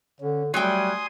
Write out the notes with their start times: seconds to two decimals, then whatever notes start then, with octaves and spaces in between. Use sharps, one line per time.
0.20 D3 C#4
0.54 F#3 G3 A3 G5 G#5 C6 D#6